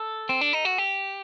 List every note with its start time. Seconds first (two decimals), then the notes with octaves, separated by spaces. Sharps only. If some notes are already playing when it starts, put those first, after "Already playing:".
Already playing: A4
0.29 C4
0.41 D4
0.53 D#4
0.65 F#4
0.78 G4